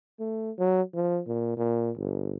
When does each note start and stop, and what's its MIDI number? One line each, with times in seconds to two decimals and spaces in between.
0.20 0.51 57
0.58 0.81 54
0.94 1.21 53
1.27 1.55 46
1.57 1.91 46
1.97 2.37 31